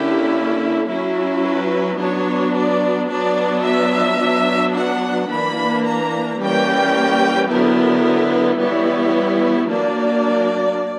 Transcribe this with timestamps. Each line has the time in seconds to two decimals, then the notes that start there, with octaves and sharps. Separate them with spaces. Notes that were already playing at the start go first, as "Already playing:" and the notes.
Already playing: D3 A#3 C#4 E4 G4
0.87 F#3 C#4 E4
1.43 B4
1.98 F#3 B3 D4 C#5
2.53 D5
3.09 F#3 B3 D4 D5
3.63 E5
4.19 F#3 B3 D4
4.73 F#5
5.28 E3 A#3 D4 B5
5.84 A#5
6.39 E3 G3 A#3 C#4 G5
7.49 D3 F#3 B3 E4 A#4
8.58 E3 G3 B3 E4 C#5
9.68 F#3 A#3 D4 D5